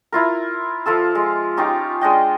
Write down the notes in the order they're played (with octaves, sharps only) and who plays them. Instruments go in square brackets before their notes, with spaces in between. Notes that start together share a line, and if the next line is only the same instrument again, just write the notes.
[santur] E4 F4 A#4
F3 F4 A4 E6
G#3
C#4 D#4 F4 G4
G#3 D4 D#5 G5